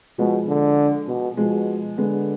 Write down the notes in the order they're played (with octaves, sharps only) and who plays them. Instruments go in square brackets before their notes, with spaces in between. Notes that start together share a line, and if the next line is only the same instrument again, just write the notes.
[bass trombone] B2 [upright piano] F3 G#3
[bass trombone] D3
B2
[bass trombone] B2 [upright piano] F3 G#3
[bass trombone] D3 [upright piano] G#3 B3